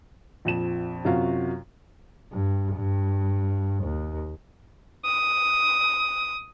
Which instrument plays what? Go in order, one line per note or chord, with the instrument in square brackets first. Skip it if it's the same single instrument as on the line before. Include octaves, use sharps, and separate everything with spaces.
[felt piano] A#1 F2 E7
F#2 C3 F4 F#4 F5
[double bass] G2
G2
D#2
[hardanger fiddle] D#6